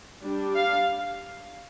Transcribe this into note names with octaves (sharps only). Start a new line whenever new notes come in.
G3 D4
F5